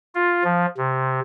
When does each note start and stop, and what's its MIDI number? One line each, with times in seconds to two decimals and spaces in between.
0.15 0.43 65
0.44 0.66 53
0.78 1.20 48